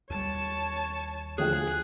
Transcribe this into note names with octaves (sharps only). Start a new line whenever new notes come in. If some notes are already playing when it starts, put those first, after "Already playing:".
D#2 G3 C#5 A5
D2 F3 G#4 G5 F#6